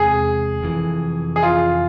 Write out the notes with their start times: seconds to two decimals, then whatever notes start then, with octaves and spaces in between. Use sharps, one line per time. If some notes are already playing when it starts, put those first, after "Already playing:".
Already playing: E2 C3 G#3 C4 G#4
0.61 F1 F2 E3
1.36 G#4
1.43 F4